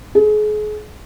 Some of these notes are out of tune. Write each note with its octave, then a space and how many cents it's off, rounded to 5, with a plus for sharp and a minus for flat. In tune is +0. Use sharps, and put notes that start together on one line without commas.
G#4 +35